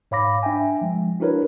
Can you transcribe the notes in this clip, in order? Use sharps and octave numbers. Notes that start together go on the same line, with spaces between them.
G#2 C#5 F5 B5 D6 A#6
D4 E5 G5 G#5
F3 G#3
D4 E4 F#4 A#4 B4 C#5